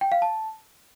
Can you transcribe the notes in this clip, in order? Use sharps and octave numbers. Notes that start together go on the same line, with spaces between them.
G5
F5
A5